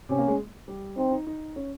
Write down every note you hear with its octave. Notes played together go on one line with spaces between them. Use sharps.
C3 C#4
A#3
G#3
G3
C4 D#4
D#4
D#4
C#4